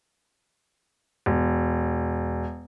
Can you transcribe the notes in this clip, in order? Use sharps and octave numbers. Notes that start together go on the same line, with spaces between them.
E1